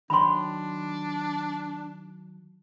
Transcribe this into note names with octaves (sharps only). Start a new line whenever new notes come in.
D#3 F#3 D4 G5 B5 C6